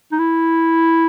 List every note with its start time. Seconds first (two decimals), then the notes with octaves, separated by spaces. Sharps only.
0.12 D#4
0.19 E4